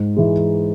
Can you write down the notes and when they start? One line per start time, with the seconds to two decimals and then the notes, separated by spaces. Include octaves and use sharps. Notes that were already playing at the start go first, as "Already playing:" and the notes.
Already playing: G#2
0.16 E3 G#3